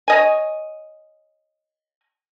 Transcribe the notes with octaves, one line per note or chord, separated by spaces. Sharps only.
C#5 D#5 G#5